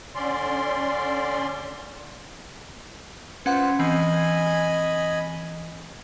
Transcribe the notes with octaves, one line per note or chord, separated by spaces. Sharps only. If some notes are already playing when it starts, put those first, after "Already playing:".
D3 C#4 D5 C6
C#4 F4 B4 C5 F#5
E3 C4 D#5 G#5 B5